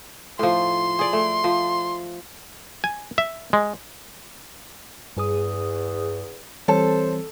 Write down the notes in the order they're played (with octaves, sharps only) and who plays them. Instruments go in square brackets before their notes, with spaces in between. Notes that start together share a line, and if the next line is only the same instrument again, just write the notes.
[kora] A2 F3 [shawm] C6
[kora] G#4 D5
A3
F3
[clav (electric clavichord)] G#5
E5
G#3
[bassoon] E2 [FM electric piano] G2 G#4 D#6
[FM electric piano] E3 G3 C4 [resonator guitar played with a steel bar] A4 [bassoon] C5 [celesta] C#5 A5